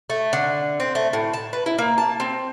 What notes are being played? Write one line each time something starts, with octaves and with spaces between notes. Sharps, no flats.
A3
D3
C4
A3
A2
A5
B4
E4
A#3
A5
C4